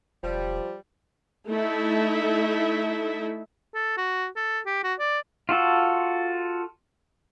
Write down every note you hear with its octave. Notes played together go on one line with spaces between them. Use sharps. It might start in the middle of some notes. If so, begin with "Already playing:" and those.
E1 F3 G3
A3 D#4 E4 A4 E5
A4
F#4
A4
G4
F#4
D5
F4 F#4 A4